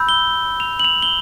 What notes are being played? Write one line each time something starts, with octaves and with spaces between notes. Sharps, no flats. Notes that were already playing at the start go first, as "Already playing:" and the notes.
Already playing: B5 E6 G6
G7
F7
F#7
F7
G7